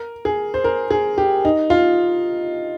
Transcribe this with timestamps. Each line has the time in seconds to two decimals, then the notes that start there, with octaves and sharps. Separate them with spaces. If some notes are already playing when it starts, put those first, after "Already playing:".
Already playing: A#4
0.25 G#4
0.54 C5
0.64 A#4
0.91 G#4
1.18 G4
1.45 D#4
1.70 F4